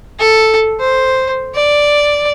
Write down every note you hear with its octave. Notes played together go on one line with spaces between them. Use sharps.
A4
C5
D5